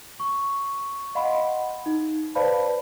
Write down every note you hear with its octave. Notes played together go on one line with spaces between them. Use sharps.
C#6
D#5 F5 F#5 B5 C6
D#4
B4 C5 D5 F5 A5 B5